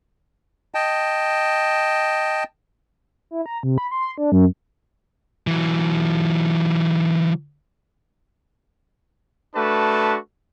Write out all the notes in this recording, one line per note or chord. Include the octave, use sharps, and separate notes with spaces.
D#5 G5 A5
E4
A#5
C3
B5
C6
D4
F#2
E3 F#3
A3 D4 F#4 B4 A5